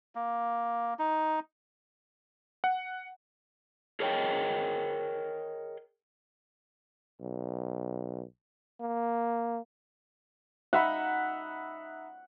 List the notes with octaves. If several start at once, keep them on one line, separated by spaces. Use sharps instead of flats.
A#3
D#4
F#5
G#4 A#4 C#5 D#5 G5
B1
A#3
D#4 E5 F#5 B5